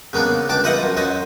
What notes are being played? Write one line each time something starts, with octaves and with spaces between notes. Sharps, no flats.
C#3 A#3 B3 D4
C#2 D4 A5 D6
F4 B4 C5 D#5 E5 F#5
F#2
F#2 F#3 C5 D#5